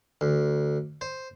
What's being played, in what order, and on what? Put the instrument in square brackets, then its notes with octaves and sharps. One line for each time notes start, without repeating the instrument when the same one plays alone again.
[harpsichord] D2
C5